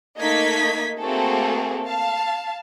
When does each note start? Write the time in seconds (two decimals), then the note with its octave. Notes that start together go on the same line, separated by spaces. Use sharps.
0.17 A3 A#3 D#4 D#5 G#6 B6
0.99 A3 A#3 C4 F#4 G#4 A4
1.85 F5 A5